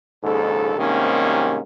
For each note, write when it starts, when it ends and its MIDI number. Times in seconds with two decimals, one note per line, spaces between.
0.23 0.76 34
0.23 0.76 39
0.23 0.76 44
0.23 0.76 49
0.23 0.76 69
0.78 1.59 36
0.78 1.59 44
0.78 1.59 48
0.78 1.59 51
0.78 1.59 58
0.78 1.59 61